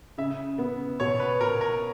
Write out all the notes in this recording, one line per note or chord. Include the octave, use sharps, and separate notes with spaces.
C#3 E5
B3
B2 C#5
B4
B2 A#4
A#4